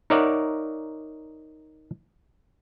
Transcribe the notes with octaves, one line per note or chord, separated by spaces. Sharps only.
D#4 A#4 C#5 D5 E5 F#5